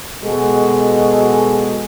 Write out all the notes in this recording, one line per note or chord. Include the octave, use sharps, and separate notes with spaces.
B2 G#3 F#4 G#4 A4